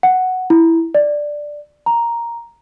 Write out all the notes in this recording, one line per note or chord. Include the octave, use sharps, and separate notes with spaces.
F#5
E4
D5
A#5